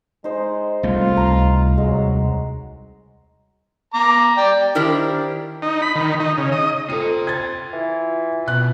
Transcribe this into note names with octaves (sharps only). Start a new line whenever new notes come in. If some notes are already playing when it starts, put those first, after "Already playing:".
G#3 D#4 C5
C2 A3 F4
C#2 A#5
D#2 F#3 G#3
A#5 D6
D5 G5
D#3 D4 E4 G4 A#4 C5
D#4
B5
D#3
D#4
C#3
D#5
C4 F4 A4 A#5 D#7
G#6 A6
E3
B2 F#6